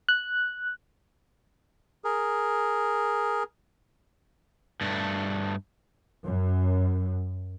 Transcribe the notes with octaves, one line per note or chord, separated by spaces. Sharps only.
F#6
G#4 A#4
G2 A3
F#2